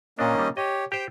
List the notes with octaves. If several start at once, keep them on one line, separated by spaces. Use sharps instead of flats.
A#2 A#3 C#4 D4 D#5
D#3 G3
G4 C#5 D#5
G4 C5 G5